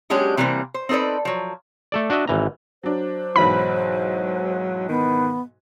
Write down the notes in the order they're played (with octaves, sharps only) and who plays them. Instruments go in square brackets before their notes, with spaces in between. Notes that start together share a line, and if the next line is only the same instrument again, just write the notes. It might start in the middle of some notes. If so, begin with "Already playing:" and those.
[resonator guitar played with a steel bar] F#3 G#3 C#4 D4 G4
C3 E3 G3 A#3 C4
C5
C4 D#4 A4 B4 D5
F3 F#3
[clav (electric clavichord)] A3 A4 D5
D4 F#4 D#5 E5
G#1 E3 A#5
[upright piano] F#3 D4 [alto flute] C5
[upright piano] B1 G#2 E3 [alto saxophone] F#3 [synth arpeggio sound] B5
[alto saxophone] D#3 [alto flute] B3